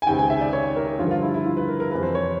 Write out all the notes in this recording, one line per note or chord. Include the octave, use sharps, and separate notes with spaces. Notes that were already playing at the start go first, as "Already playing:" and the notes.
G#5
C#2 C3 D#3 G5
G#5
E5
D5
C#5
A#4
G2 D3 F3 F4
F4
E4
E4
F4
B4
A#4
A#4
F2 C3 E3 B4
C5
C#5